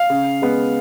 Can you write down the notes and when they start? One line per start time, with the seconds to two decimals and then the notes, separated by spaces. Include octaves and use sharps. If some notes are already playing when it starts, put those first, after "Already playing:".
Already playing: F5
0.10 C#3
0.42 G#3 B3